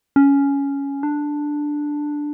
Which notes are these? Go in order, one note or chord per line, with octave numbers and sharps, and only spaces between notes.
C#4
D4